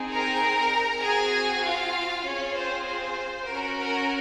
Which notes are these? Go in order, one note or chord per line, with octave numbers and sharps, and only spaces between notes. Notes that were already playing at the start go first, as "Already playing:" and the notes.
Already playing: C4 D#4 G#4
A#4 A#5
C4 F#4 G#4 G#5
F4 F5
C4 C#4 F4 G#4 C#5
C5
C5
C#4 F#4 A#4
A#4